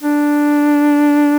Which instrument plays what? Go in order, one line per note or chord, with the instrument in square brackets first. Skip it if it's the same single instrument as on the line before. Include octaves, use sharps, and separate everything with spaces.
[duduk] D4